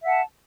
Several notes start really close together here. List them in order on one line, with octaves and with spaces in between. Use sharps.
E5 F#5 A5